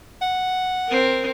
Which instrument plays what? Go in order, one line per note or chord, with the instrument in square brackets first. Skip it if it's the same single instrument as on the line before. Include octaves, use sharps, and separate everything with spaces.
[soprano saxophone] F#5
[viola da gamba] C4 A#4